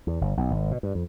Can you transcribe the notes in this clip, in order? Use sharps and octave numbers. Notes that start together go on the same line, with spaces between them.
E2
G1
B1
G#1
B2
G2
F2